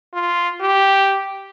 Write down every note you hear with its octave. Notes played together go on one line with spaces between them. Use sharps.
F4
G4